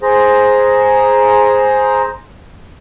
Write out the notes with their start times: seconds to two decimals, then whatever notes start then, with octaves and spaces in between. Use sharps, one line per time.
0.02 G#4 C5 A#5